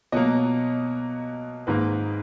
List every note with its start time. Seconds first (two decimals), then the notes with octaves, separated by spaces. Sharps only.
0.12 B2 F#3 A#3 D#5
1.67 G#2 D#3 A#3 B4